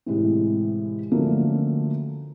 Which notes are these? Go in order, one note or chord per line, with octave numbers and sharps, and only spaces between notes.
A2 C3 E3 G#3
D3 F3 F#3 A3 A#3 C#4